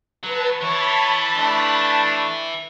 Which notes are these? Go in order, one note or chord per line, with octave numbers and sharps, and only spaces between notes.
F#3 B4 A5
E3 E4 C#5 A5 B5
A3 D4